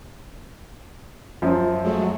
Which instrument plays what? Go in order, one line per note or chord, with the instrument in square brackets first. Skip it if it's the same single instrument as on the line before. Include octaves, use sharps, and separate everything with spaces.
[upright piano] F#2 F3
[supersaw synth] F#3 G#3 A3